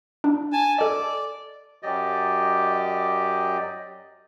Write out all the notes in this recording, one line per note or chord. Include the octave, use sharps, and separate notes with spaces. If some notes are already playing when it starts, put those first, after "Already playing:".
D4
G#5 A5
A4 D5 D#5
F#2 F#3 G4 D5 D#5